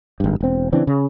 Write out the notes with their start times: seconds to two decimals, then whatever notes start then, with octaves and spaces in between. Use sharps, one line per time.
0.20 G#1 G2
0.41 E1 C4
0.72 C#3 E3 C4 D4
0.87 C#3